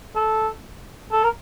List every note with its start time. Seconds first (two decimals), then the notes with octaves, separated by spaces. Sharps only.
0.16 A4
1.12 A4
1.24 A#4